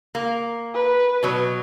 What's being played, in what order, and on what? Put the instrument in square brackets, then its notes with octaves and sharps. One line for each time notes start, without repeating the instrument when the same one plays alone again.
[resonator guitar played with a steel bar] A#3
[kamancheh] B4
[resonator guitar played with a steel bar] B2 F#3